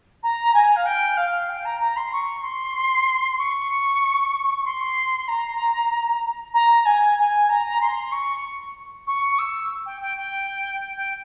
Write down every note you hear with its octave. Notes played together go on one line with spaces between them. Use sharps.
A#5
G#5
F5
G5
F5
G5
A#5
A#5
C6
C#6
C6
C#6
C6
A#5
A#5
G#5
G#5
A#5
C6
C#6
C#6
E6
G5
G5
G5
G5